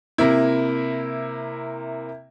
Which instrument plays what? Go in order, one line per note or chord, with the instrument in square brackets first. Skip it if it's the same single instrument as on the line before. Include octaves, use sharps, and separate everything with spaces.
[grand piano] C3 A#3 E4